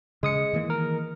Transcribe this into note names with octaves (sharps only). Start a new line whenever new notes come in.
C#3 G#3 D#6 C#7
D#3 E3 A#3
A#4